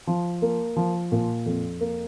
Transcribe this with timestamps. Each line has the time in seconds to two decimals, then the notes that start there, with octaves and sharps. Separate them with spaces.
0.07 F3
0.42 A#3
0.76 F3
1.12 A#2
1.46 F2
1.81 A#3